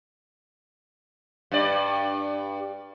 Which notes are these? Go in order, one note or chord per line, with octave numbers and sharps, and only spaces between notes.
G2 D5